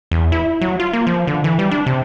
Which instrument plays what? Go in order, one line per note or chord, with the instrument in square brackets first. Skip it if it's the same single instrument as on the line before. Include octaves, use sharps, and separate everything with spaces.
[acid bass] E2
E4
F#3
F4
A#3
F3
D3
E3
G3
D4
C3